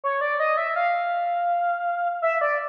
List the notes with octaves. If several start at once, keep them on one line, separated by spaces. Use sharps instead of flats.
C#5
D5
D#5
E5
F5
E5
D5